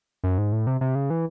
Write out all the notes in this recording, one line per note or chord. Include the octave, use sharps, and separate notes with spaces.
F#2
G#2
A2
C3
C3
C#3
E3